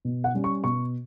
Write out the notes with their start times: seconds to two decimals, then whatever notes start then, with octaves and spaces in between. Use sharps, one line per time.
0.05 B2
0.24 F#5
0.35 G3 C#4
0.44 C#6
0.64 B2 C#6